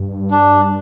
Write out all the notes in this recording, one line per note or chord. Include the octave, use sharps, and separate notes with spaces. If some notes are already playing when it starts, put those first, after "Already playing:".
Already playing: G2
D4